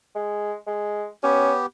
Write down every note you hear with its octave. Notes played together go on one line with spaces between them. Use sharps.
G#3
G#3
B3 C#4 G4